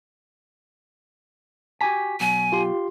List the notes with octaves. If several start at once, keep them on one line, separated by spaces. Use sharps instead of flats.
F#4 G4 G#5 B6
B2 F#3 G#5
F4 G4 C6